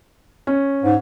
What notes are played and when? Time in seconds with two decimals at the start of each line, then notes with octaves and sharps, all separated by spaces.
0.47 C#4
0.83 G#2